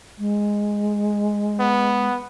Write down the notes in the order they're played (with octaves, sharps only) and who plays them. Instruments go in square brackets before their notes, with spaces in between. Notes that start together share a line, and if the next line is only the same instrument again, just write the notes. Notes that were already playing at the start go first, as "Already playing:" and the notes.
[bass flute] G#3
[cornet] B3